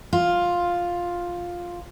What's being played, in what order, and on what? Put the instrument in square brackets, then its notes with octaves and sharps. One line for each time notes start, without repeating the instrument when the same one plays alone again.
[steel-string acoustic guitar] F4